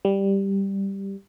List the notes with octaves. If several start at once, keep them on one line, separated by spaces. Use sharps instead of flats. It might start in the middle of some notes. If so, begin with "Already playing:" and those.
G3